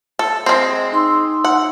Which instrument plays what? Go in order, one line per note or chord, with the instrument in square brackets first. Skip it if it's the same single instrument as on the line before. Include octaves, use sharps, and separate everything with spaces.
[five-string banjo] A4
[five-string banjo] G#3 C4 [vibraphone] C5
[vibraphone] D#4 C6 E6
[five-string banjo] F#5